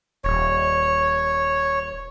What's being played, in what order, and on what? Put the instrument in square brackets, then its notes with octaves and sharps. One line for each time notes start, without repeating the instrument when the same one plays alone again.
[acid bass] D#1 [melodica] C#5